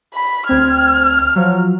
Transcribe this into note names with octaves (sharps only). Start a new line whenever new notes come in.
B5
D2 C4 F6 G#6
F3 F#3